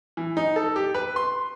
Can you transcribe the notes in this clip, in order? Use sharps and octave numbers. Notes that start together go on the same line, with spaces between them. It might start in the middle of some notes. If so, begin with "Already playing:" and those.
E3
D#4
A4
G4
B4
C6